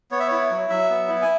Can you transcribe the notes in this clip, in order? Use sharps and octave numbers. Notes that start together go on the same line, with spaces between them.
B3 C#5
E5
E4 C#5
F#3
F#3 E5
B3
E4
G#5